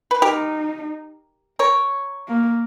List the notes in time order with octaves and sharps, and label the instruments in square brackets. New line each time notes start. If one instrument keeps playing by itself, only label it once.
[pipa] B4
[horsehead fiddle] D#4 [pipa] G4 A#4
[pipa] A#4 C#5
[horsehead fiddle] A#3